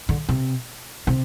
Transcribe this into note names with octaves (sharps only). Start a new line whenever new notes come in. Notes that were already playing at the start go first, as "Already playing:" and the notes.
D3
C3
C3